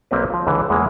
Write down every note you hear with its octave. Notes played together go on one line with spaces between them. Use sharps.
B1 A#3 C4 B4
F3 F4
C#2 D3 E3
E2 E3 G#3 A#3